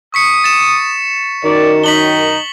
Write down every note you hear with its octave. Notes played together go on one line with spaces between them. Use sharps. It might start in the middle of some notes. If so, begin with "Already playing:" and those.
C#6 D#6 B6 C#7
A6 E7
F#2 D#3 D5
D#4 B6 F#7 G7